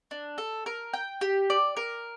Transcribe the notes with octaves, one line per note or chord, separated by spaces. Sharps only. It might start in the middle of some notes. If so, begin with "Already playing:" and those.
D4
A4
A#4
G5
G4
D5
A#4